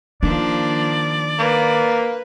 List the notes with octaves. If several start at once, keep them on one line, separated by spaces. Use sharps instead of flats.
D#3 F3 A#3 D4 D5
A#3 B4